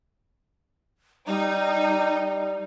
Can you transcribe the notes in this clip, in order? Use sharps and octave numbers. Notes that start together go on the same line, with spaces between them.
G3 D#4